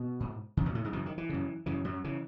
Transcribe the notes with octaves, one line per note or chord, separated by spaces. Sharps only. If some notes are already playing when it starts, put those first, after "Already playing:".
Already playing: B2 B3
G#2
E2 C#3
B2 B3
A2 A3
G#2 G#3
F#2 C#3 E3
D#3
E3
F#2 C#3
F#2 C#3 E3
F#2 F#3
C#3 E3